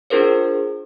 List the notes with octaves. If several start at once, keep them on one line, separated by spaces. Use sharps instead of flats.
D4 F4 G#4 A#4 C5